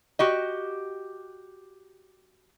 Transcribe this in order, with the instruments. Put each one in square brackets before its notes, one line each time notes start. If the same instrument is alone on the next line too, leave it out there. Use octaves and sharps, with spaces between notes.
[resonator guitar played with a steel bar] F#4 G4 D#5